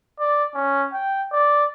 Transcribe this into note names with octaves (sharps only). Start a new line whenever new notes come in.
D5
C#4
G5
D5